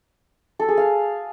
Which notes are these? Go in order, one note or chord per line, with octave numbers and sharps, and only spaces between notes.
A4
G#4
F5